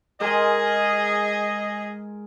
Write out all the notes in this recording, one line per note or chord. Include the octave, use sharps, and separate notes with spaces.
G#3 G#4 A#4 D#5